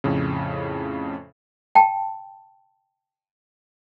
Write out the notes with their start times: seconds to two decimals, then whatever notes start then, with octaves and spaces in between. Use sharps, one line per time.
0.04 F2 A2 C#3
1.75 G5 A5